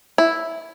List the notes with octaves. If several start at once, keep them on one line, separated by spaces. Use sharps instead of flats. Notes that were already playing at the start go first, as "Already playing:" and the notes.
E4